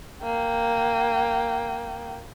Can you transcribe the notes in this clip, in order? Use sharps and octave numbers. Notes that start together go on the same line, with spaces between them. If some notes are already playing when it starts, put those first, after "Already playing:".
A#3 G5